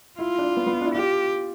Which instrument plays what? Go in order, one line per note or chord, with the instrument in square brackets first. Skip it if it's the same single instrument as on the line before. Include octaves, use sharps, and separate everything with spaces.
[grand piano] E4 [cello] F4
[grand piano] D4
B3
B3
D4
E4
[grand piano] F4 [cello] G4